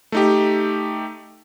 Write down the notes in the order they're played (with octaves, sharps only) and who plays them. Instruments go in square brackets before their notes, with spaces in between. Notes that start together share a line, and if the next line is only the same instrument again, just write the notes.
[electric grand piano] A3 D#4 G4